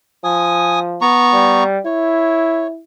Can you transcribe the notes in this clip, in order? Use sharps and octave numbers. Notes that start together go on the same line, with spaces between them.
F3 G#5 D#6
B3 A#5 C#6
G3
E4 C#5